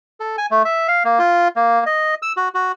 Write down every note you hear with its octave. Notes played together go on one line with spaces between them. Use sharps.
A4
G#5
A3
E5
F5
A#3
F4
A#3
D#5
E6
F#4
F#4